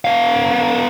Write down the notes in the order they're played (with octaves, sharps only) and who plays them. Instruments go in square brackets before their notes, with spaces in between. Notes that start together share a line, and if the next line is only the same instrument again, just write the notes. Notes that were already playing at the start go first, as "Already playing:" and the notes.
[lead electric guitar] B3 F5